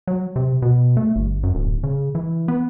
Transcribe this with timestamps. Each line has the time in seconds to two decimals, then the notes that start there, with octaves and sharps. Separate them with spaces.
0.07 F#3
0.36 C3
0.62 B2
0.97 A3
1.16 G1
1.43 F#2
1.55 D1
1.83 C#3
2.15 E3
2.48 B3